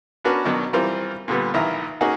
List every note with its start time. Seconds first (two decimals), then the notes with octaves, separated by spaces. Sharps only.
0.24 B3 C#4 D4 F#4 A#4 B4
0.45 B2 D#3 F#3 D4 D#4
0.73 E3 G3 C4 F4 A#4 C5
1.28 A#2 D3 G3 B3
1.54 A#1 D#3 E3 E4 E5 A#5
2.01 A#3 C#4 D#4 F#4 G#4 F#5